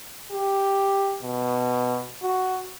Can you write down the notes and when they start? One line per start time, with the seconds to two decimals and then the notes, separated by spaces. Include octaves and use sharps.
0.31 G4
1.22 B2
2.22 F#4